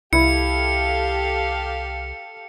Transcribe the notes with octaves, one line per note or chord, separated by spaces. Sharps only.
C2 E4 G4 A4 F5 C#7